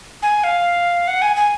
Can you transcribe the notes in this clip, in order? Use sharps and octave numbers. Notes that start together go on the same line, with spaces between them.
G#5
F5
F#5
G#5
G#5